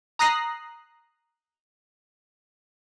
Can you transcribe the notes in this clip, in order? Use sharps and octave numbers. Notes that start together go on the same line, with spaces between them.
A#5 D#6 F#6 A#6 C7